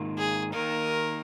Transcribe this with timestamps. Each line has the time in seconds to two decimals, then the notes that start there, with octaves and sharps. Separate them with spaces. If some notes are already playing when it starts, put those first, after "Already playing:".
Already playing: G#2 D#3 A#3 F4
0.18 G#4
0.53 D#3 A#3 D#4 A#4